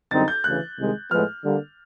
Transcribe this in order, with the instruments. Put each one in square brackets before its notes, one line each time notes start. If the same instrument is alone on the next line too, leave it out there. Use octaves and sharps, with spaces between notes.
[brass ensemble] F#2 D3 G3 C4 D#4 [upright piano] A6
[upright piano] G6
[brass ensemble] D2 C#3 E3 [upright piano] F#6
[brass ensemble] C2 C3 D#3 G#3
[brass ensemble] A2 F3 G#3 B3 [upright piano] F6
[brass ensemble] D3 G3 A#3